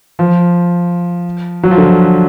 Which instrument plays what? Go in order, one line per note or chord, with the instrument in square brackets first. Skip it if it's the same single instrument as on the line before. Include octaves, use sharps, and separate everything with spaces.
[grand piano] F3
F#3
F3
D3